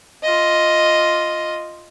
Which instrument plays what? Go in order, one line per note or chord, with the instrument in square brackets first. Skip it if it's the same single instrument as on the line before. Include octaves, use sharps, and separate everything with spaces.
[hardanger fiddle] F4 D#5